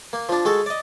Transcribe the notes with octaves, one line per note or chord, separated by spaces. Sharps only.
A#3
F3 D4
G#3 F#4 A4
D5 D#5